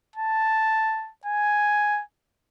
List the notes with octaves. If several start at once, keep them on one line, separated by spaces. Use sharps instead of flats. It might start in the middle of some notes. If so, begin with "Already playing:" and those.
A5
G#5